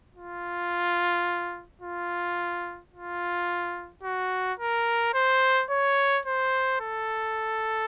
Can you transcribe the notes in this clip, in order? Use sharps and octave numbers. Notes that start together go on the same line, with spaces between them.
F4
F4
F4
F#4
A#4
C5
C#5
C5
A4